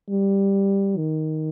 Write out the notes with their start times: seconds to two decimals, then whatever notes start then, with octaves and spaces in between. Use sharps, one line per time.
0.10 G3
0.97 D#3